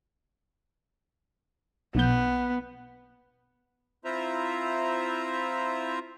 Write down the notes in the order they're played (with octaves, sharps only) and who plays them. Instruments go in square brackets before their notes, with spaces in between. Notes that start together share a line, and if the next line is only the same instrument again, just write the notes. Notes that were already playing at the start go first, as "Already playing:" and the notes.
[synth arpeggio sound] B1 G6 [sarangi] B3
[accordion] C4 E4 F4 C5 E5 A#5